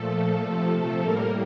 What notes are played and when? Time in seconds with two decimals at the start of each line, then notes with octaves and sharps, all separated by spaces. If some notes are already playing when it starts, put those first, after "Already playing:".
Already playing: A#2 F3 A3 A4
0.42 C3 F3 A3
1.01 A2 G3 A#3 A#4